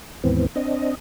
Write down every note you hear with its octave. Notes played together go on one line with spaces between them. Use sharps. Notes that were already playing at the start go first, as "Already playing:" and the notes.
D#2 G#2 E3 B3 C4
C4 D4 D#5